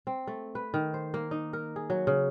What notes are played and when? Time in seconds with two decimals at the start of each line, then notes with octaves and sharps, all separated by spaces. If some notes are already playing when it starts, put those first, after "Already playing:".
0.07 C4
0.27 A3
0.55 B4
0.74 D#3
0.94 C5
1.14 A#3
1.31 D#4
1.53 A#4
1.76 G#4
1.90 F#3
2.07 C#3